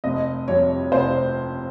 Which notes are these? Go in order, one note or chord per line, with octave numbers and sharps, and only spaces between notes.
F1 D#5
F2 C3 C#5
F1 C5